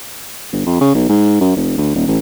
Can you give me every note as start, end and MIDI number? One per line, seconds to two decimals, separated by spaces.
0.52 0.66 31
0.66 0.79 41
0.81 0.92 49
0.95 1.08 35
1.09 1.36 44
1.41 1.53 42
1.56 1.73 29
1.78 1.91 38
1.95 2.06 27
2.07 2.18 33